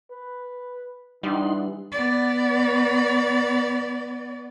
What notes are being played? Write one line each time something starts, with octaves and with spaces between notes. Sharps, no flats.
B4
E3 G3 D4 D#4 F#5 C6
B3 D5